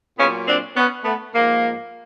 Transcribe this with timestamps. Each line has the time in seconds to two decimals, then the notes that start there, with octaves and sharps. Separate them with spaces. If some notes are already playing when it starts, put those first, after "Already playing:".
0.18 A#2 F#3 B3 C#4
0.47 C4 D4
0.75 B3 C#4
1.05 A3 B3
1.34 G#2 F3 A#3